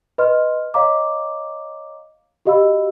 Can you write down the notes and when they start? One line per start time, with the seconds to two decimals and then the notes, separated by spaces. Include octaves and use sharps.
0.18 B4 D#5 C6 F6
0.74 C#5 D#5 F5 A#5 D6
2.45 F#4 G4 D#5 F5 B5 E6